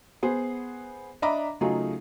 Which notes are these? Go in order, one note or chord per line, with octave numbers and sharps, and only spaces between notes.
B3 G#4 C5
D4 D#5 E5 A#5 B5 D6
C#3 F#3 A3 D#4 F4 G#4